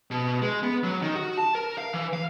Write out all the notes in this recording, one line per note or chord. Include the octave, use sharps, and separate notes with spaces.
B2
G#3
B3
F#3
D#3
F#4
A5
A#4
F5
E3
F5